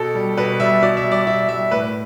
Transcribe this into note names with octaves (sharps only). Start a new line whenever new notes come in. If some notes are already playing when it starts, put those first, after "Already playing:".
Already playing: B2 A4
G3
B2 B4
G3 E5
B2 D5
E5
G3
D5
B2 E5
G3 E5
A2 B4